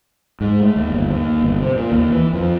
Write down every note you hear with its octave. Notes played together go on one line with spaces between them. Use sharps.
G#2
A3
D#2
G1
D#2
G1
C3
A#2
D#2
E3
F2